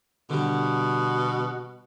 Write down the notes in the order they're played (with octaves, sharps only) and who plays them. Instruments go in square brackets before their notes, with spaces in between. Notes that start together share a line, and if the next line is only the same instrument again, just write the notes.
[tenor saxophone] B2 [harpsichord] D3 G3